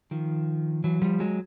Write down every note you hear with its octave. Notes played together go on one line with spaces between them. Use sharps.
D#3 F3
E3 F#3
F3 G3
F#3 G#3